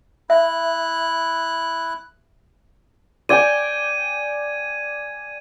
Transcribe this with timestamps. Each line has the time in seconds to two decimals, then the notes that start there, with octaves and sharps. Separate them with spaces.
0.30 E4 E5 F#6
3.29 D5 G5 G#5 G#6 D#7